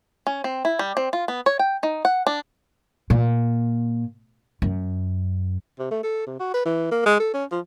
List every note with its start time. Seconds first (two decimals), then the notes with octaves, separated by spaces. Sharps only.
0.27 C#4
0.44 C4
0.65 E4
0.79 G3
0.97 C4
1.13 F4
1.28 B3
1.46 C#5
1.59 G5
1.83 D#4
2.05 F#5
2.27 D4
3.10 A#2
4.62 F#2
5.79 C3
5.91 A3
6.03 A4
6.27 C3
6.40 F#4
6.54 B4
6.65 E3
6.91 A#3
7.06 G#3
7.20 A4
7.34 C#4
7.51 F3